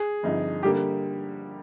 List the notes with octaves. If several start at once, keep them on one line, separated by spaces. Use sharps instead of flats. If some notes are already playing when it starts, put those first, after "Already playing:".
Already playing: G#4
G1 G2 F3 C4 D#4
D3 G3 A#3 G4